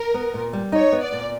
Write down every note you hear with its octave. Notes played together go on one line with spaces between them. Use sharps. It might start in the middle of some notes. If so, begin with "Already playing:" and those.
Already playing: A#4
B3
A#2
G3
D#4 C#5
B3
D5
A#2